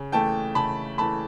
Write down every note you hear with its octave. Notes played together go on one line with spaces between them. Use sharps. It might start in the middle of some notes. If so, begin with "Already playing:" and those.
Already playing: C#3
E3 A3 G5 A5
C#3 A5 B5
E3 A3 A5 B5